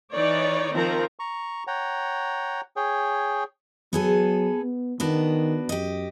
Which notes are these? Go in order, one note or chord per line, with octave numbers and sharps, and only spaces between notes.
E3 D#4 C#5 D5
D#3 F3 C4 A#4 A#5
A#5 C#6
C#5 F#5 G5 A#5
G#4 C#5 G5
F#3 B3 G#4 A4
B3
D#3 B3 D4 F#4
F#2 G4 D#5